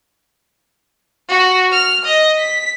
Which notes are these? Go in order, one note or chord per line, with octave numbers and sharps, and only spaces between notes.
F#4
F6
D#5
B6